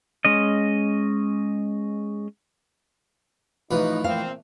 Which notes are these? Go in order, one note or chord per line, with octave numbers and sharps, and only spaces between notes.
G#3 C#4 D#5
A1 F3 D#4 B4
A#2 C4 F5